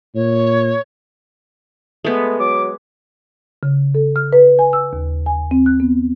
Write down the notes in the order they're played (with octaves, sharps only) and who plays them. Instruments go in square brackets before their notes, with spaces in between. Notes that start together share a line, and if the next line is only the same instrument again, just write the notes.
[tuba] A#2 [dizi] C#5
[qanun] G#3 B3 [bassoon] A3
[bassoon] F#3 [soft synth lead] D6
[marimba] C#3
A4
F6
B4
G#5
E6
D#2
G#5
C4
F#6
B3